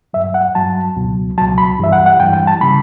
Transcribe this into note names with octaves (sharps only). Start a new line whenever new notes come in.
G2 F#3 E5
F#5
G2 F#3 A5
C#2 B2 F#3
C#2 B2 F#3 A5
B5
G2 E3 G3 E5
F#5
F#5
G2 E3 G3 G5
G5
A5
C#3 G3 B5